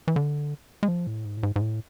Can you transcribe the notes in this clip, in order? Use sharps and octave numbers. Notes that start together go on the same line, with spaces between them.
E3
D3
G#3
F3
A2
G#2
A2
G#2
G#2
A2